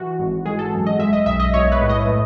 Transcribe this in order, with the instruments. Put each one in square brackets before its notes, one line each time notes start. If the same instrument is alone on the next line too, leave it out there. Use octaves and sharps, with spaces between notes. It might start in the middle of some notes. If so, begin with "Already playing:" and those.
Already playing: [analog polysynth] E3 F#4
G#1
G#3 G#4
A4
F#2
D#5
G#3 E5
D#5
B1 E5
D#5
B1 C#5
B4
A2
D#5
A3